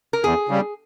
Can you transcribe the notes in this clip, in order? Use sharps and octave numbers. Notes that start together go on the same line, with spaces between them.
A#4
E2 G#4
C#3 G3